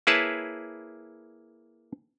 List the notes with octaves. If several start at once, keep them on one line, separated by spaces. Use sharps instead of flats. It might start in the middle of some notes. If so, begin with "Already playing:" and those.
A#3 E4 G#4 B4 C#5 A5